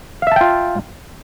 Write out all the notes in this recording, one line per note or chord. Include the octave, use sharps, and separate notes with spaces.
F4 E5 F5 G5 A5